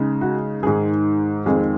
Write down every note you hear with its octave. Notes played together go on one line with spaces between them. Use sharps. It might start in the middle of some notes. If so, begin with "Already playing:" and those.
Already playing: C#3 G#3 D#4
F#4
G#2 D#3 G#3 G#4
F2 D#3 G#3 C4 G#4